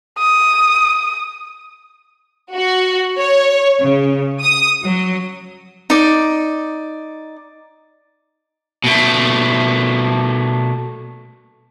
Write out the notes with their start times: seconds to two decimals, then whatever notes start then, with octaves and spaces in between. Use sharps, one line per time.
0.18 D#6
2.54 F#4
3.19 C#5
3.81 C#3
4.41 D#6
4.84 F#3
5.90 D#4 D5
8.84 B2 A3